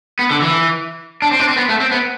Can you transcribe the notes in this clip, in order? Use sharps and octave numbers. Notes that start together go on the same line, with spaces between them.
B3
D3
E3
D4
C4
D4
C4
B3
A3
C4
B3